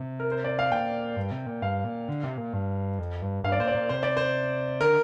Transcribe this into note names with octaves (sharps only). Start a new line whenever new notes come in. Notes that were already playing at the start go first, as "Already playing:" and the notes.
Already playing: C3
A#4
C5
D5
F5
A#2 G5
G2
C3
A#2
G2 F5
A#2
D3
C3
A#2
G2
F2
G2
G2 F5
D5
A#2 C5
D5
A#2
C3 C5
D5
C5
D3 A#4